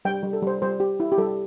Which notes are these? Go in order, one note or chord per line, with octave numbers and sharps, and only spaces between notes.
G3 G5
G3
A4
G3 C5
G3 C5
G4
E4
G4
G3 A4